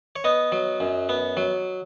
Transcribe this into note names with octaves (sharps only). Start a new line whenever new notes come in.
C#5
B3 D#5
F#3
F#2
B3
F#3